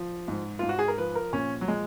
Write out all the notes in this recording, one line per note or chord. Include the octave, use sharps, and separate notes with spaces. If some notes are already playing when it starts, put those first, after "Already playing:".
Already playing: F3
G#2
G#2 F4
F#4
G#4
A#4
F3 B4
A#4
A#2 C#4
F#3
F3 G#3